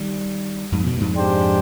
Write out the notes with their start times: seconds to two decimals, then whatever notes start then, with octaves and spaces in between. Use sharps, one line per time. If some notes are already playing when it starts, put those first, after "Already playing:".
Already playing: D#3 G3
0.72 F2 G#2
0.86 G2 B2
1.01 F2 G#2
1.16 G#3 D4 G4 C5